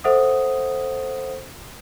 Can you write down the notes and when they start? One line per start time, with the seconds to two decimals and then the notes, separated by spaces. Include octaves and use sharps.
0.04 A4 C5 E5 F#5 D#6